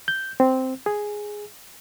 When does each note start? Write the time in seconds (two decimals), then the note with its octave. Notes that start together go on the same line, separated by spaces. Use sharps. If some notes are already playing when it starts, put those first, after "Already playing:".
0.08 G6
0.40 C4
0.86 G#4